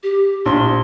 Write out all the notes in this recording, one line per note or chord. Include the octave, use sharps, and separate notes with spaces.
G4
A#1 C6